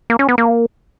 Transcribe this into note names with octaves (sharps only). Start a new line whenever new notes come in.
A#3
C#4
B3
A#3